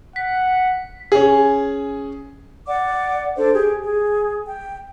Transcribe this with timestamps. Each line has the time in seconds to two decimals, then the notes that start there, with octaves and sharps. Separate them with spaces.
0.16 F#5 B6
1.12 C#4 G#4
2.67 D5 F#5 D6
3.37 D4 A4 C5
3.54 G4 G#4
3.84 G#4
4.45 G5